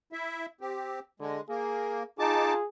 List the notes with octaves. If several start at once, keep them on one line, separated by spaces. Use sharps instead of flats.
E4 E5
C4 G4
D3 G#3
A#3 G#4
D#4 F4 G#4 A5 D6